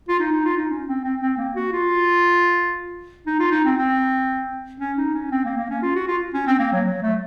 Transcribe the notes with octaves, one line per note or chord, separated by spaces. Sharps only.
F4
D#4
D#4
F4
D#4
C#4
C4
C4
C4
A#3
F#4
F4
D#4
F4
D#4
C4
C4
C#4
D#4
C#4
C4
A#3
A#3
C#4
F4
F#4
F4
C#4
C4
A#3
F#3
F#3
A3